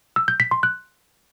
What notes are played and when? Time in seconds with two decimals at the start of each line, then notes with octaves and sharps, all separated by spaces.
0.16 E6
0.28 G6
0.40 B6
0.51 C6
0.63 F#6